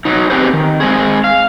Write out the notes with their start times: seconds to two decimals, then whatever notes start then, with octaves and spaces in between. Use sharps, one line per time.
0.05 F#3 D#4
0.30 C4 G4 G#4 B4 C5
0.53 D#3
0.80 G#3 C4 G#4
1.24 F5